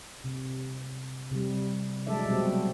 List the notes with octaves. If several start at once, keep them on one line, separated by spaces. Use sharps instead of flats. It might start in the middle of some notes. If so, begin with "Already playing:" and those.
C3
C3 G3
F#3 G#3 D4 A4 D5 E5
B2 F#3 G3 C4